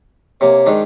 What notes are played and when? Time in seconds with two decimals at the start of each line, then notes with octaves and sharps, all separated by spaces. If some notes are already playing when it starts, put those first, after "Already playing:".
0.41 C3 A#3 C#5
0.66 G#2 D#3 D4